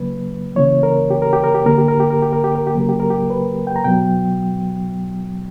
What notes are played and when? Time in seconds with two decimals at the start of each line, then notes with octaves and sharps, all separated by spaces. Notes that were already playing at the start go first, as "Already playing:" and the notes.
Already playing: C#3 F#3 A#3 B4
0.56 C#3 E3 A#3 C#5
0.83 A#4
1.10 G4
1.22 A#4
1.33 G4
1.44 A#4
1.55 G4
1.65 D3 A#3 A#4
1.78 G4
1.88 A#4
2.00 G4
2.11 A#4
2.22 G4
2.33 A#4
2.44 G4
2.55 A#4
2.67 G4
2.75 C#3 F#3 A#3 A#4
2.89 G4
3.00 A#4
3.10 G4
3.30 B4
3.67 G5
3.76 A#5
3.84 B2 F#3 B3 G5